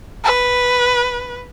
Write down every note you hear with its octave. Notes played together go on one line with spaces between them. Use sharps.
B4